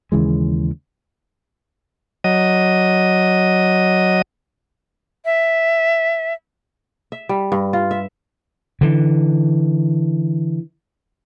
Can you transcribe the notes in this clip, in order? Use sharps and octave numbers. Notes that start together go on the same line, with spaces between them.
D#2 C#3 E3 G#3
F#3 D#5
E5
E5
G3
G2
F4
E5
D3 E3